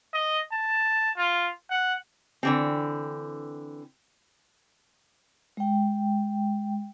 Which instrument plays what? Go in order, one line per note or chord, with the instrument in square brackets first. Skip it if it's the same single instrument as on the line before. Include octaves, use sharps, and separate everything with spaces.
[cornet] D#5
A5
F4
F#5
[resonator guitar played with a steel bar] D3 E3 C4
[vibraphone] G#3 G5